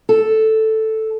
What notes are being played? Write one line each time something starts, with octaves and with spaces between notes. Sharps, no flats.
A4